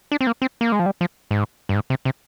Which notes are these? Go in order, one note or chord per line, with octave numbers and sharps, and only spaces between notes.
D4
C4
A#3
C4
A#3
G#3
F3
G3
F3
G#2
G2
G#2
C3
C3